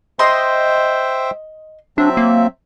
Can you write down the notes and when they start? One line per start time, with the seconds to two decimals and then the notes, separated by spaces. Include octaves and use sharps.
0.19 C5 D#5 E5 G5 C6
1.98 F#3 C4 D4 E5
2.17 A#3